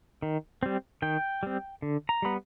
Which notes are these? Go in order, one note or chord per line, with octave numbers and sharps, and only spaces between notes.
D#3
G3 C4
D#3 G5
G3 C4
D3
A#5
G3 B3 B5